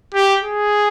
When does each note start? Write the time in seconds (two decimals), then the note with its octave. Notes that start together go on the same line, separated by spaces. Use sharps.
0.14 G4
0.43 G#4